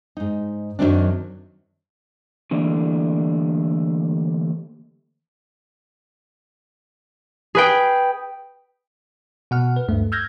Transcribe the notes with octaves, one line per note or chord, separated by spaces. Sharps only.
G#2 D#4
F#2 B2 D#3 F#3 C4 D4
D3 E3 G3 A3 A#3 D4
G#4 B4 G5
B2 F#5 F6
B4
D2 G2 A3
E6 F6 G6 G#6 A#6